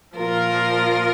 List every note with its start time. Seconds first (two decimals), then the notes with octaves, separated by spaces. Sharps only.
0.17 A#2 F3 F4 A#4